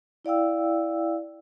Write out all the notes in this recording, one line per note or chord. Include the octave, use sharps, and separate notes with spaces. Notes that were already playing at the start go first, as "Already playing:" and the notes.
E4 D5 F5 G5 E6